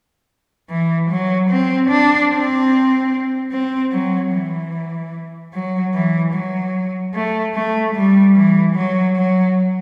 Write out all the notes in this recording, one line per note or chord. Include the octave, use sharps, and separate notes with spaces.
E3
F#3
C4
D4
C4
C4
F#3
E3
F#3
E3
F#3
A3
A3
G3
E3
F#3
F#3